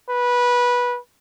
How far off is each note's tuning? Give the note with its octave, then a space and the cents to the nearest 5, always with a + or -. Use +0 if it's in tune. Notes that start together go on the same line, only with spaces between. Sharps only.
B4 -15